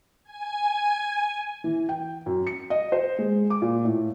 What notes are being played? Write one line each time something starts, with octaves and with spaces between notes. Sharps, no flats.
G#5
E3
G5
F#2
C#7
D#5
C5
G#3
D6
A#2
A2